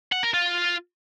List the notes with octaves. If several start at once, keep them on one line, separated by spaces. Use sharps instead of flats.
F#5
A#4
F4